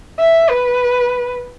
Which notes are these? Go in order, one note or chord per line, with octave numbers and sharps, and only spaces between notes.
E5
B4